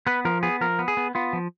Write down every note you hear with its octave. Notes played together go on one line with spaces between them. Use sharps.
B3 B4
F3 A#4
B3 G#4
F3 A#4
B3
G#4
B3
B3 F4
F3